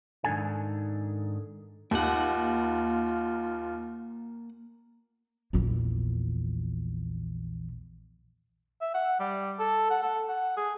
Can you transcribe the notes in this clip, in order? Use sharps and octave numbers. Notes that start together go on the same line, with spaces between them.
G#2 D#3 E3 D4 A4 G#5
D#2 A#3 F4 F#5
A#1 E2
E5
F#5
G3
A4
F#5
A4
F#5
G#4